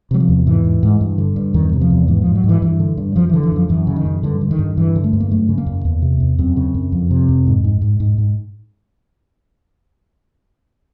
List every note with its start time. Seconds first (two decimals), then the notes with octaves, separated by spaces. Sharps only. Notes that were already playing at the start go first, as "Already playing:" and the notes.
0.11 C3 F#3
0.20 F3
0.29 E2
0.46 G#2 E3
0.65 G#2
0.83 G#2
1.01 G2
1.18 D3
1.36 G2
1.54 E2 D#3
1.73 C3
1.81 F3
1.90 E2
2.08 G#2 E3
2.22 G#2 F3
2.35 F#3
2.44 G#2
2.49 E3
2.62 G2 E3
2.80 D3
2.97 G2
3.16 F#2 F3
3.29 D3 E3
3.43 E3
3.52 F#2 F3
3.69 F#2 E3
3.87 C#3
3.96 D#3
4.06 F#2
4.23 G2 D3
4.41 D3
4.51 D#3
4.59 G2
4.77 G2 E3
4.96 D3
5.04 A3
5.13 G2
5.20 A#3
5.31 F#2 A3
5.49 C#3
5.58 A#3
5.66 F#2
5.85 E2
6.02 C3
6.20 E2
6.39 F#2 C4
6.57 C#3
6.75 F#2
6.92 F2
7.11 C3
7.29 F2
7.47 G#2
7.64 G#2
7.81 G#2
8.00 G#2
8.18 G#2